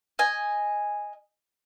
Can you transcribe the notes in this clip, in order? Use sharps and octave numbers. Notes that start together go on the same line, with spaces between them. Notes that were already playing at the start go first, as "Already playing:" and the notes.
D#5 G#5